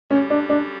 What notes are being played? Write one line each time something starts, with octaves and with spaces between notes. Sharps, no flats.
F#2 D3 G3 C#4
D4
D4